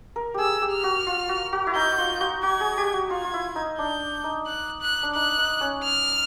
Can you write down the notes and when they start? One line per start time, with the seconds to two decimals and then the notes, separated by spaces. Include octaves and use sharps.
0.16 A#4
0.34 G4 G#4 E6
0.62 G4
0.72 F6
0.84 F#4
1.07 F4
1.29 F#4
1.53 F#4
1.67 E4
1.76 D#4 G6
1.98 F4
2.20 F#4
2.43 F#4 G#6
2.61 G#4
2.78 G4
2.94 F#4
3.10 F4 G#6
3.25 F4
3.34 E4
3.56 D#4
3.79 D4 G6
4.24 D#4
4.46 F#6
4.81 F#6
5.03 D4
5.15 D#4 F#6
5.38 D#4
5.61 C#4
5.84 F6